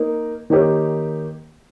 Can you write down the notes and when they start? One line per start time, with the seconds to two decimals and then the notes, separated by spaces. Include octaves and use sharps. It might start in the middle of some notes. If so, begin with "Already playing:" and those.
Already playing: A#3 D#4 A#4
0.50 D#3 A#3 D#4 G4 C#5